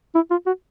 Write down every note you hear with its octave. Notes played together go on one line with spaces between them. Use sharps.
E4
F4
F#4